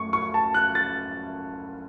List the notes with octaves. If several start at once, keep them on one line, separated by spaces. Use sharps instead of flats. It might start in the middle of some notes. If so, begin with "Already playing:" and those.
Already playing: F#2 A3 C#6
C#6
A5
F#6
A6